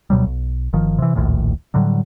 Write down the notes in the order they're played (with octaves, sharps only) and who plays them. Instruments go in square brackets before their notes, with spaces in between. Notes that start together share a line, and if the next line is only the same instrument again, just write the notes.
[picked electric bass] D2 B2 F#3 G3
B1
G1 D#3 F3
C3 E3
D1 A#1 D#2 A2
A2 D3 F#3 G3